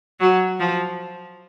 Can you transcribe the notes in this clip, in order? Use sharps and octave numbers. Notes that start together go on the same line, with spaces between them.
F#3
F3